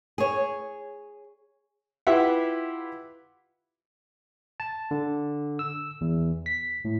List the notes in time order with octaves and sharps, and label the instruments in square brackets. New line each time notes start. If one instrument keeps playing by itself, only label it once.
[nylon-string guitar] G#4 C#5
[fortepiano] E4 F4 G4 B4 E5 F#5
[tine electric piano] A5
D3
E6
E2
B6
A2